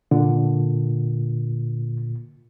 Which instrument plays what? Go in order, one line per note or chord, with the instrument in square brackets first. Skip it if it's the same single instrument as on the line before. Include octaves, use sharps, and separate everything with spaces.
[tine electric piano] A#2 [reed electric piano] D3